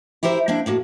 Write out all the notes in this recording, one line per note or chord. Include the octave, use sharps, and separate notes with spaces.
E4 G4 A#4 C5 E5
A#3 C4 D4 E4
A2 A#3 F#4